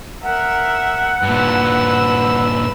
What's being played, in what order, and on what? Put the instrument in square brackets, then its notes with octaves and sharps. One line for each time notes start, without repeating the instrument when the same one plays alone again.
[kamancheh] A#4 E5 [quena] F#5
[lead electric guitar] G2 A#2 [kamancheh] B4 E6